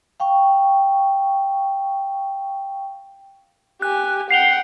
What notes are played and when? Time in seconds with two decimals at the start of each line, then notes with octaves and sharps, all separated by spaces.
0.20 F5 G5 C#6
3.82 G4 G#5 F#6
4.31 F#5 G5 C7 F7 G7